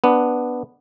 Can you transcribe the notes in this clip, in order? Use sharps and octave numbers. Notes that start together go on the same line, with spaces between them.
B3 D4